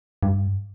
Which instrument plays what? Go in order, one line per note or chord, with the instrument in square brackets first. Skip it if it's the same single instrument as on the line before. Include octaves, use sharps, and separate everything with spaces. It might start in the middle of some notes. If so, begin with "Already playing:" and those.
[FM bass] G2